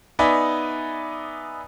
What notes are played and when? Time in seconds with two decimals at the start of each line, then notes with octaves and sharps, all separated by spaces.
0.19 B3 D#4 B4 D5 E5 G#5